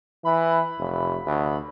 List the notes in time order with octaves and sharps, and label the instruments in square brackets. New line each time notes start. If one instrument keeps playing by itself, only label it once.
[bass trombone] E3 [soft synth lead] B5
[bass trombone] F1
D2